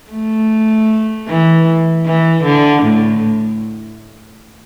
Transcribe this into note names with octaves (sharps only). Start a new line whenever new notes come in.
A3
E3
E3
D3
A2